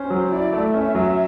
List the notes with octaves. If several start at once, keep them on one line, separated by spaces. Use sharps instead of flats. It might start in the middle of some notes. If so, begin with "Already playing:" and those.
Already playing: C#4 C5
F#3
E4 D5
A3
C#4 E5
F#3